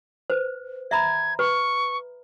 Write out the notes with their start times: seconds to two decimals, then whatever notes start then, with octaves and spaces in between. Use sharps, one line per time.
0.30 B4 C5
0.91 E5 A#5 B5 G#6
1.39 B4 C#6